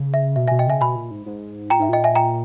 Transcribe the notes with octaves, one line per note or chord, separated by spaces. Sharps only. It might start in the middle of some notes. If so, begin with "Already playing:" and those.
Already playing: C#3
E5
B2 E5
B2 E5 G#5
D#5 G5
C#3 E5 G#5
B2 G#5 B5
A#2
G#2
G#2
A#2 G5 A#5
G#2 E5
A#2 D#5 G5
E5 G#5
G5 A#5